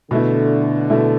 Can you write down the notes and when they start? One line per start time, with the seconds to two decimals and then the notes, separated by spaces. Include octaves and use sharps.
0.11 B2 D3 A3 E4
0.90 B2 A3 E4